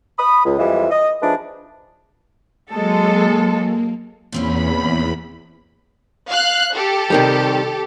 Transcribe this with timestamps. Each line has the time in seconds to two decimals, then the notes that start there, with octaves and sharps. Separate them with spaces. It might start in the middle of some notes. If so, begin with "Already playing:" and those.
0.19 B5 D#6
0.45 C#2
0.58 F2 E3 G3 G#3 F4 E5
0.91 D#5
1.21 F3 A3 D4 D#4 G#4 B4
2.71 F#3 G#3 A#3 A4
4.32 E2 A#2 C4 C#4 B5
6.28 F5 F#6
6.74 G4 A4
7.10 C3 D#3 G3